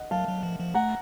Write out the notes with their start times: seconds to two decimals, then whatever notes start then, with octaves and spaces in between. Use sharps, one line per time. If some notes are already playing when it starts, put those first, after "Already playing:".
Already playing: D#5 F#5
0.11 F#3 F5 A5
0.28 F#3
0.43 F3
0.60 F3
0.75 A3 F#5 A#5